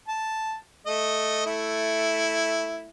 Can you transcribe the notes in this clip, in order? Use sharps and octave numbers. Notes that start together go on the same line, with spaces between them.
A5
A3 D#5
A3 E4